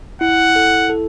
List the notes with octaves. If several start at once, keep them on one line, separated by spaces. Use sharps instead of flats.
E4 F#5
A4
A4